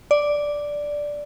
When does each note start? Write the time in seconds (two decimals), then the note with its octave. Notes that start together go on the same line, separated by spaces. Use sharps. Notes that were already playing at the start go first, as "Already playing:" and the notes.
0.11 D5